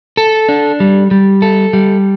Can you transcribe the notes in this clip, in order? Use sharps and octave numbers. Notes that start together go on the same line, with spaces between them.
A4
D4
G3
G3
A4
G3